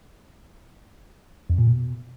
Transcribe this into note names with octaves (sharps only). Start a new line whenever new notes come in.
F2
A#2
B2